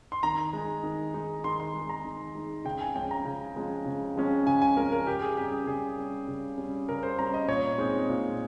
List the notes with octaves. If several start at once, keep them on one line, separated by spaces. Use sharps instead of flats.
C6
D#3 A#5
G#3 D#4
D#3
G#3 D#4
D#3 C6
C6
G#3 D#4
A#5
D#3
G#3 D#4
C#3 G5
G#5
F3 G#3 C#4 G5
A#5
C#3
F3 G#3 C#4
C#3
F3 G#3 C#4
C#3 G#5
G#5
F3 G#3 C#4 A#4
A#4
C#3 G4
G#4
G3 C#4 G4
G#4
C#3 G#4
G3 C#4
C#3
G3 C#4
C#3 A#4
C5
G3 C#4 A#5
D#5
A#2 C#5
G#3 C4 D#4
A#2